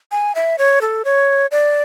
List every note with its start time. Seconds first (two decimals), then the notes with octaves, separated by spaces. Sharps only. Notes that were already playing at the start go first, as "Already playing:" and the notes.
0.12 G#5
0.35 E5
0.58 C#5
0.81 A4
1.05 C#5
1.51 D5